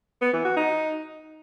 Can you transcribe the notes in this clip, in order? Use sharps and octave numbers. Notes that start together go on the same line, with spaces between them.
B3
E3
F#4
D#4